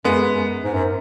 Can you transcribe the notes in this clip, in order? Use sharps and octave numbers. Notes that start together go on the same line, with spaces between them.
F#2 G#3 B3
F#2
G#2
F#2